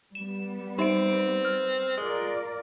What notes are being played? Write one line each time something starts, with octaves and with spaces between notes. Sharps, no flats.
G3 B3 E7
C4 D#4 E5 D7
F6
G#3 F4 A#4 D5